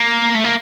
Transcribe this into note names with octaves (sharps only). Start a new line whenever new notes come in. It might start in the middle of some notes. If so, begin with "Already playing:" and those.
Already playing: A#3
A3
A#3